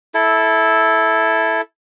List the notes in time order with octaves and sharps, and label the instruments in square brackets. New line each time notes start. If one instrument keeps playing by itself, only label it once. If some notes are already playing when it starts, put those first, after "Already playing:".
[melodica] E4 A4